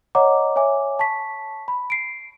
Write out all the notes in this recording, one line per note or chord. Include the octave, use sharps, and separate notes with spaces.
C#5 D#5 F#5 A#5 D6
C#5 E5 G#5 D6
A5 C#6 B6
B5
C7 D7